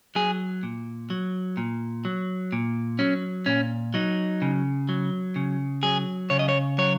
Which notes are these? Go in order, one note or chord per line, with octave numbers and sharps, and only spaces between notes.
F#3 G#4
A#2
F#3
A#2
F#3
A#2
F#3 C#4
A#2 C#4
F#3 D#4
C#3
F#3
C#3
F#3 G#4
C#3 C#5
D#5
C#5
F#3 C#5